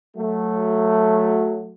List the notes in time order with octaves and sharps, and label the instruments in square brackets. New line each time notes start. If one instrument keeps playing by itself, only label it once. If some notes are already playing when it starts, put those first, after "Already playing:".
[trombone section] F#3 A3